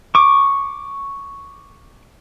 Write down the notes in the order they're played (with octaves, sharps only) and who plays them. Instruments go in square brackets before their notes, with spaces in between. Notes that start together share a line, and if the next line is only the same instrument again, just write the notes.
[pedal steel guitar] C#6 D6